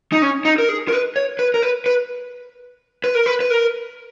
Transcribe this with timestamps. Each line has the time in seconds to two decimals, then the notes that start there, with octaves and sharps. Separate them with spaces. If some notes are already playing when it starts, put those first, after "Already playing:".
0.12 D#4
0.22 C#4
0.45 D#4
0.58 A#4
0.69 G#4
0.88 A#4
0.92 B4
1.16 C#5
1.39 B4
1.54 A#4
1.63 B4
1.86 B4
3.04 B4
3.15 A#4
3.26 B4
3.40 B4
3.50 A#4